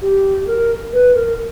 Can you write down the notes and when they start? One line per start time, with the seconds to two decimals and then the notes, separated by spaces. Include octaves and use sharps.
0.02 G4
0.47 A#4
0.93 B4
1.14 A#4